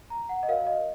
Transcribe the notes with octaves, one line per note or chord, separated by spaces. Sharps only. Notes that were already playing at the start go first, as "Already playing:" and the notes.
A#5
F#5
D#5
F#4 A#4 C#5 F5
D#5